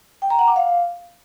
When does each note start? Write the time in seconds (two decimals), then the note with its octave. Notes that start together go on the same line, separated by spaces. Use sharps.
0.22 G5
0.30 A#5
0.39 F#5
0.47 D6
0.56 F5